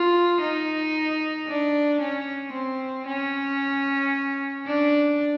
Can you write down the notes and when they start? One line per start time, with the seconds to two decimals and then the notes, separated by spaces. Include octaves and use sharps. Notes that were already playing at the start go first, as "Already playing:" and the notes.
Already playing: F4
0.41 D#4
1.47 D4
2.01 C#4
2.53 C4
3.06 C#4
4.66 D4